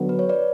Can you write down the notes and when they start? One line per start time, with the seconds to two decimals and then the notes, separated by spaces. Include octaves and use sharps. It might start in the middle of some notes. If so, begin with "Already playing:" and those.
Already playing: D3 F#3 B3
0.09 B4
0.19 C#5
0.29 B4 D5